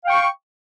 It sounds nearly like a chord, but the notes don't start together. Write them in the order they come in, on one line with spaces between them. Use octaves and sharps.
F5 G5 C#6